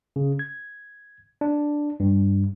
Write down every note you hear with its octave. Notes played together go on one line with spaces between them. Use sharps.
C#3
G#6
D4
G2